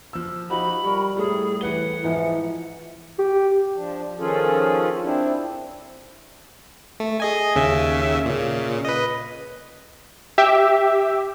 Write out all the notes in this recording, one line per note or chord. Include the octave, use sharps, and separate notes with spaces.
F3 E6
F3 D#4 F#4 G4 B5
G3 A#4 C#6
A2 G3 G#4 A4
E3 B4 F#5 G7
G#2 E3 F3
G4
F3 D4
D#3 F3 C#4 F4 G#4 A4
C4 D4 E4
A3
G#4 D#5 G#5
D#2 C#3 E5
A#2 C#3
B4 D#5
G4 E5